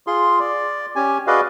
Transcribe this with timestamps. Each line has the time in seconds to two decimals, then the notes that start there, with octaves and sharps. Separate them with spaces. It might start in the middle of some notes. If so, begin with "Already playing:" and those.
0.07 F4 G#4 C6
0.40 D5
0.96 C#4 G4 G#5
1.27 F#4 G#4 B4 D5 D#5 F5